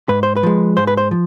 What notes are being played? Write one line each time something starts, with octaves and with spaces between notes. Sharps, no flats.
G#2 B4
C5
B4
F3 G#3
G#2 C5
B4
C5
F3